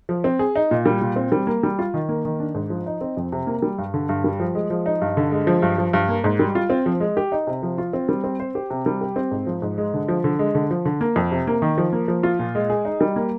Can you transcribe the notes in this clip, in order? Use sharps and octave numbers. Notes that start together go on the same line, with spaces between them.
F3
C4
G#4
D#4
A#2
G3
A#2
C4
G3
A#3
G3
F4
D#3
A#3
D#3
D4
G#2
F3
D#4
C4
F2
C3
A#3
G3
G2
D3
G2
G3
F3
G#3
F3
D#4
G2
D3
G#3
F3
G2
F3
G2
A#3
G#2
G3
F4
C4
F3
G#3
G4
D#4
C3
F3
F4
C4
G3
C4
C5
G4
C3
G3
G4
C4
G#2
F3
G#2
G#3
D3
F3
D3
G#3
D3
F3
D3
A#3
F2
C3
A#3
D#3
F3
A#3
F3
F4
A#2
G#3
G#4
D#4
G3
A#3